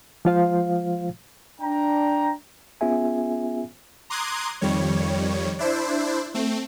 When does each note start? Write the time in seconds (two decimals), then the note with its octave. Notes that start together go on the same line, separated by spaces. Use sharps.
0.25 F3 G#3 F4 C5 F5
1.61 D4 G5 A#5
2.81 B3 C#4 F4 G#4 E5 G#5
4.10 A#5 C6 D6 D#6 F#6 G#6
4.61 F2 D#3 G3 C#5
5.59 D4 E4 C5
6.34 A3 C4